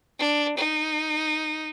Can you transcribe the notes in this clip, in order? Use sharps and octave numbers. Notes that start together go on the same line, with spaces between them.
D4
D#4